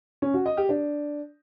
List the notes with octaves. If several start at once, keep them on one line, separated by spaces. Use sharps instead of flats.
C#4
F#4
D#5
G4
D4